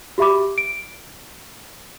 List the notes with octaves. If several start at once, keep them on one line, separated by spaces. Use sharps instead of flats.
F#4 G4 E5 B5 D6
D7